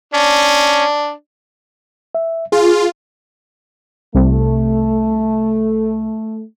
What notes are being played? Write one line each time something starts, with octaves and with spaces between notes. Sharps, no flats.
C#4 D4
E5
F4 G#4
C2 A3